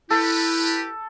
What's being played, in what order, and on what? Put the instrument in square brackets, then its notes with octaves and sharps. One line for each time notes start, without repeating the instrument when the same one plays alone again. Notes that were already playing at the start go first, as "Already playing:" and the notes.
[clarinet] E4 [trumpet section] G4 B4 [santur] A4